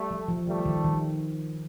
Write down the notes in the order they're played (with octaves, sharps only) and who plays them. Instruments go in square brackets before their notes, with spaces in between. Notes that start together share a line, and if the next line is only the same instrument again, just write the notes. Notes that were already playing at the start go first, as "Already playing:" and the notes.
Already playing: [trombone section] G3 A3
[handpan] F3
F3
[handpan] D#3 [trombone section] G3 A3
[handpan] D#3
D#3